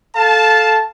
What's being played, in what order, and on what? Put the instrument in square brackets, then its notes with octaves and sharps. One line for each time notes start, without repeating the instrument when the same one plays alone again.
[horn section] A4 F5 A5